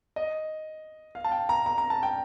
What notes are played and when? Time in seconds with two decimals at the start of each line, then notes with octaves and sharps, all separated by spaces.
0.16 D#5
1.15 F5
1.24 A5
1.32 G5
1.49 A#5
1.66 A#5
1.78 A#5
1.90 A5
2.03 G5